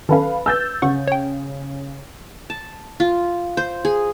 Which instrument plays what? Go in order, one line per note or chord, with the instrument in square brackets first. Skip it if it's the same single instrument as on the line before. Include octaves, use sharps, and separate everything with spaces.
[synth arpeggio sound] D#3 C#4 [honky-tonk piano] A4 B4 F5
[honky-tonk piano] E6 G6 A6
[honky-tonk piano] C#3 [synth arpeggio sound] F#5 C#6
[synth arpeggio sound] C#5 G5
[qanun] A5
F4
C5
G#4